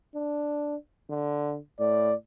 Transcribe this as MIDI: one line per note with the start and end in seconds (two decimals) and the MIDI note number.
0.15 0.76 62
1.10 1.58 50
1.80 2.14 45
1.80 2.15 74